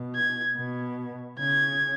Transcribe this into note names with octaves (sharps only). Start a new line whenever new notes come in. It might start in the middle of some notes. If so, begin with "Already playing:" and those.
Already playing: B2
G#6
B2
C#3 G#6